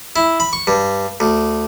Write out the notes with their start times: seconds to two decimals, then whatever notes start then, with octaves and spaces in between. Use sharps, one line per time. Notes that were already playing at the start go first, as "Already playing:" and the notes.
0.16 E4
0.40 B5
0.53 C#6
0.67 G2
1.20 D2